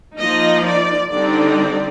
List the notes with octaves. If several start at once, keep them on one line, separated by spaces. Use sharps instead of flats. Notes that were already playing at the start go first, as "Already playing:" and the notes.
F3 A#3 D#4 D#5
D5
D3 G3 C4 D#4 D5